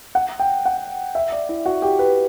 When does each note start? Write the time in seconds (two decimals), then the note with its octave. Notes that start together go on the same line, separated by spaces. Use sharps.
0.15 F#5
0.40 G5
0.65 F#5
1.15 E5
1.32 D5
1.49 E4
1.66 F#4
1.82 G4
1.99 B4